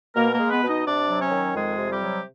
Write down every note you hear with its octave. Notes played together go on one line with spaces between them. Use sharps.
B2 A#3 A#4
A#3 A#4
G#3
B3 B4
B2
D#4 D#5
C3 D4 D5
F#3
C#4 C#5
D#3
F2 G#3 G#4
C3
G3 G4
F#3